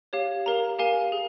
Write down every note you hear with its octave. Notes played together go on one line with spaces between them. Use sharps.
G4 C#5 F5
G4 A#4 F5 A#5
G4 A#4 F5 G#5
G#4